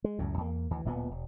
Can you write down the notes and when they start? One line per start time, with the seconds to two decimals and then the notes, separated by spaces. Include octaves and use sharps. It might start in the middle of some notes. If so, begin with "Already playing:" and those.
0.04 G#3
0.19 C#2 F#2 A2
0.37 E2 A#3
0.71 D2 E3
0.85 D1 A#2 A3 B3
1.11 E1